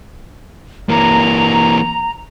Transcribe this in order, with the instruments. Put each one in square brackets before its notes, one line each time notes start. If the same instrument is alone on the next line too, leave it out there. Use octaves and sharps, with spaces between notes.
[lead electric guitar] E3 A#3 [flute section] A#5